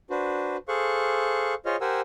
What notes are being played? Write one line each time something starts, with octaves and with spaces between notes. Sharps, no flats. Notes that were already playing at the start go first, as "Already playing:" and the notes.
D4 F#4 B4 C5
G#4 A4 C5 F5 C#6 F#6
F4 G#4 C5 C#5 D#5 F6
G4 A#4 C5 F#5 G#5 E6